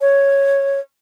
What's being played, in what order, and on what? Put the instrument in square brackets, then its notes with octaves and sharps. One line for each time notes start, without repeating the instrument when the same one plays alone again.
[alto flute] C#5